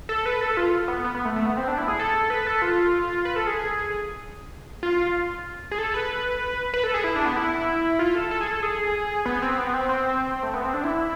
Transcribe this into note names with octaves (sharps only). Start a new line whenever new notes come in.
A4
B4
A4
F4
B3
B3
B3
A3
A3
B3
C4
D4
E4
G#4
A4
B4
A4
F4
B4
A4
G#4
F4
G#4
A4
B4
B4
A4
G#4
E4
D4
B3
E4
F4
A4
A4
G#4
A4
G#4
B3
C4
B3
C4
C4
A3
B3
C4
D4
E4